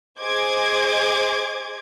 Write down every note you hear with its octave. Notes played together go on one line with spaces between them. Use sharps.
G#4 C5 D#5 D6 G#6